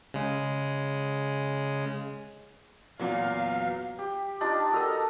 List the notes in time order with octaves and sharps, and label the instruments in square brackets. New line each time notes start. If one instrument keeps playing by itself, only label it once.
[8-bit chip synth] C#3 G#3
[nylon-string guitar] E2 B3 F#4 [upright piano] A#2 F#3 [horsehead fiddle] F5
[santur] G4
D4 D#4 F4 G4
F#4 A4 A#4 D#5